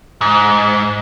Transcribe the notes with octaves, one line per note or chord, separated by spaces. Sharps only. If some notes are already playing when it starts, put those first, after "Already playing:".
G#2